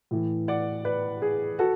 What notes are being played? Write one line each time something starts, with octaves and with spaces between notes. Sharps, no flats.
A2 E3
D5 F#5
B4 D5
G#4
F#4 A4